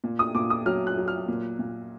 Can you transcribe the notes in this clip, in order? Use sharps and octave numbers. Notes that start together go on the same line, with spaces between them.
A#2
D#6
A#2 D6
D#6
F#3 F6
F#6
F#3
F6
A#2
A#2